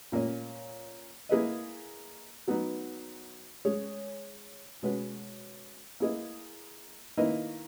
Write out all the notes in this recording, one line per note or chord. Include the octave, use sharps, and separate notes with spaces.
A#2 A#3 C#4
A#3 E4 G#4 B4 D#5
F#3 B3 D#4
G#3 C#4 G#4 C#5
B2 G#3 C#4 F#4 B4
A#3 E4 G#4 B4 D#5
D#3 A#3 E4 B4 D#5